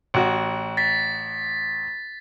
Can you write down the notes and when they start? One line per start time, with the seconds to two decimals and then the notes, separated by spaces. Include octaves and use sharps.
0.14 A1 F#4
0.77 A6 B6